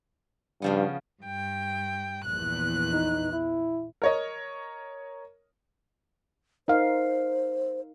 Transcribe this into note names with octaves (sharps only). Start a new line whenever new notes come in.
G2 C#3 F3 B3
G2 G5
A#1 E2 F#6
D#4
E4
A#4 C#5 D#5
D#4 A#4 C5 F5